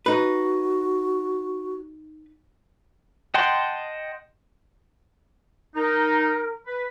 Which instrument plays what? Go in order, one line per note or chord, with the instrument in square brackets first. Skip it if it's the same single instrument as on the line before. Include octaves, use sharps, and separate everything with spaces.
[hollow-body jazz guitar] D#4 B4 [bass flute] F#4
[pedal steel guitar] D#5 F#5 G5 A5 C6
[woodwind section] D#4 [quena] A#4
[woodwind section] B4